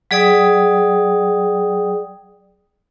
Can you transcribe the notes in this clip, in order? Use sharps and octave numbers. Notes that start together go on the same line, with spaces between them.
F#3 G#4 D5 G5 D#6